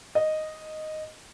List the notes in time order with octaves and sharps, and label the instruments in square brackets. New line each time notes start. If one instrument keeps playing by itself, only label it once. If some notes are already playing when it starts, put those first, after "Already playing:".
[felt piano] D#5